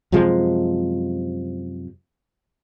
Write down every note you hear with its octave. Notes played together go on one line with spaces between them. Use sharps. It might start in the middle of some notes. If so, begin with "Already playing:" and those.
F#2 C3 F3 G#3